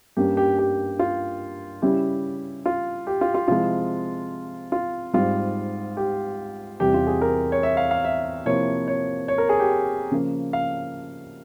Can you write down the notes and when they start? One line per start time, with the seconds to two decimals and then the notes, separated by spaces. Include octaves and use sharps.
0.17 G2 G3 A#3 C#4 G4
0.37 G4
0.59 G4
0.99 F4
1.82 C#3 G3 C#4 E4 G4
2.66 F4
3.07 G4
3.21 F4
3.35 F4
3.48 C3 F3 G#3 E4 F4
4.72 F4
5.14 G#2 G3 C4 F4
5.97 G4
6.80 E2 C3 G3 G4
6.94 F4
7.07 G#4
7.22 A#4
7.52 C#5
7.63 E5
7.77 F5
7.91 F5
8.04 E5
8.46 C3 F3 A#3 E4 C#5
8.88 C#5
9.28 C#5
9.38 A#4
9.49 G#4
9.60 G4
10.11 C#3 F3 A#3
10.53 F5